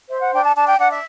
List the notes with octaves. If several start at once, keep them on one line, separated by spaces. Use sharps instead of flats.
C5 E5
F#5
D4 G5
A5
D4 A5
G5
D4 F#5
E5